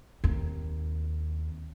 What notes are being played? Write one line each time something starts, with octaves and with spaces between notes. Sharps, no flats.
D#2 C4